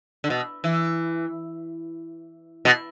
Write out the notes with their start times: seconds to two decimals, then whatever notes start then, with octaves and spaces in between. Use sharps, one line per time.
0.24 D3
0.30 B2
0.64 E3
2.65 B2